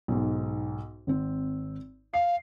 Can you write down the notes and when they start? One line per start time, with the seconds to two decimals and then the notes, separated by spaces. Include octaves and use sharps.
0.08 B1 G#2
1.07 G#1 C4
2.14 F5 C7